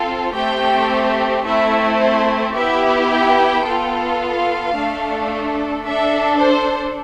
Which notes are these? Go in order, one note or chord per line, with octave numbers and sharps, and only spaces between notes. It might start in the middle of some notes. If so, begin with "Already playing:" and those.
Already playing: C4 F4 A4
A3 C4 G4 G5
A3 C4 E4 E5
C5
B3 E4 G4 E5
G5
B3 F4 A4
F5
A3 D4 A4
D4 A4 E5
C5